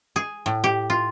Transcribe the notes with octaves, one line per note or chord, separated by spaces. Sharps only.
G#4
A2
G4
F4